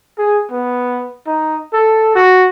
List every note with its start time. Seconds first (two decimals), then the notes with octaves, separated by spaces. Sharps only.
0.18 G#4
0.51 B3
1.27 D#4
1.73 A4
2.15 F#4